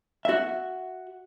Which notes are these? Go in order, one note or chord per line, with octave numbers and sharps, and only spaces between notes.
F#4 E5